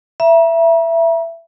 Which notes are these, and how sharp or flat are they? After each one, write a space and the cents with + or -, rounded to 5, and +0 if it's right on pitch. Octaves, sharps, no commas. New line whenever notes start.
E5 +15 A#5 +40